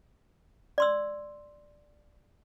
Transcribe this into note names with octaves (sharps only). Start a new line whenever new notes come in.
D5 C6 E6